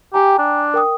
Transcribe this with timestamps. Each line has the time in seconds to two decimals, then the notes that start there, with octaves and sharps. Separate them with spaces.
0.14 G4 G5 G#5 A#5
0.39 D4
0.74 A#4 G5 D#6